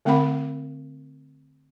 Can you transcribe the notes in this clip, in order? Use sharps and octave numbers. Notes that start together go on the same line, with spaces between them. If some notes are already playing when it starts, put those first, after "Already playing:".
D3 A3 C4 A#4 F#5 B5